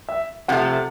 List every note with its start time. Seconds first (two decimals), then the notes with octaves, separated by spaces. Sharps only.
0.09 E5
0.48 C3 F3 A3 F#5